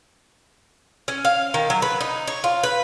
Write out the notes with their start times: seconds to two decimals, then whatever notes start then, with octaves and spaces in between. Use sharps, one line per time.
1.08 C#4
1.25 F5
1.54 D#3
1.70 F#3
1.82 B4
2.00 D#4
2.27 C#5
2.44 F4
2.63 B4